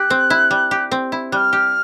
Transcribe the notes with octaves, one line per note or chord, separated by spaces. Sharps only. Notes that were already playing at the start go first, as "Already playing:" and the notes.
Already playing: G4 F#6
C4
E4
G3
G4
C4
E4
G3 F6 F#6
G4